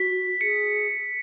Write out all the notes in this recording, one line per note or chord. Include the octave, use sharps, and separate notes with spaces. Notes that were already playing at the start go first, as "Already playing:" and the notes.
Already playing: F#4 B6
G#4 C#7